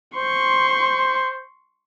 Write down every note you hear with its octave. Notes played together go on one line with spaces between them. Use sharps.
C5 C6 C#6